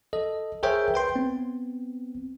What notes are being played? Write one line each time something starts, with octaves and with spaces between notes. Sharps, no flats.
A4 D#5
G#4 A#4 C5 C#5 E5 G5
B4 G5 C6
B3 C4